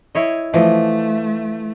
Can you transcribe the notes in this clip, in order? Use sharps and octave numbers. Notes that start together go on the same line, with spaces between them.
E4 C#5 D#5
E3 F3 A3 D#5